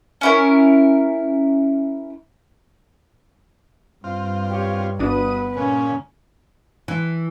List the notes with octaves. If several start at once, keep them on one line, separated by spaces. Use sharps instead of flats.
C#4 E4 A#4
G2 C4 F4
G4 C#5
G1 B3 D4 F#4 B4 D#6
A#2 C#3 C#4
E3